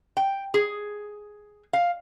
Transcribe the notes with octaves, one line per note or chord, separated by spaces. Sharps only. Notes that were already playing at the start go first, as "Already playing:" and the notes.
G5
G#4
F5